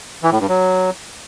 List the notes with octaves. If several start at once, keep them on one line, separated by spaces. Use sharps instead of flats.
E3
A2
G2
F#3